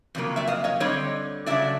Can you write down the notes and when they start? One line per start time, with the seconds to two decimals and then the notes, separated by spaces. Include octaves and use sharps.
0.15 F2 C#3 F#3 A#3
0.36 D5 E5
0.47 D#5 F5
0.64 C#5 D#5
0.80 D3 G3 C4 C#5 D#5
1.46 C#3 F#3 A3 D4 D5 E5